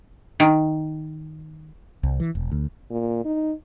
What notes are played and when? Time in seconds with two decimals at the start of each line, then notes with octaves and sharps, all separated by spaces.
0.40 D#3
2.03 C2
2.20 E3
2.35 E1
2.52 D2
2.91 A#2
3.25 D#4